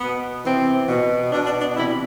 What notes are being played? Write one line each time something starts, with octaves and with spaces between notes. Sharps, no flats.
B2 B3
C3 E3 C4
B2
B2 D4
D4
D4
C3 E3 E4